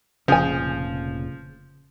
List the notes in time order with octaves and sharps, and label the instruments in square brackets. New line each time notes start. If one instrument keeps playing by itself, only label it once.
[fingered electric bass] F1 A#2 C#4 [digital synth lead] C#3 [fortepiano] F3 [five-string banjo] G#4 G#5